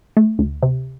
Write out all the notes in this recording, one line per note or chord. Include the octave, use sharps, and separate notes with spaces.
A3
D2
C3